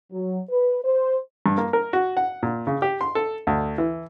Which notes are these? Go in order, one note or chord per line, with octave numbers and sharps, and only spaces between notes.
F#3
B4
C5
G2
A#3
A#4
F#4
F#5
A#2
C#3
G4
C6
A4
D2
E3